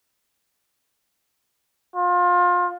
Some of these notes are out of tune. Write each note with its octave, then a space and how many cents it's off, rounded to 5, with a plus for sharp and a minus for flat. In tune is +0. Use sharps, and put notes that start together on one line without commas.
F4 +25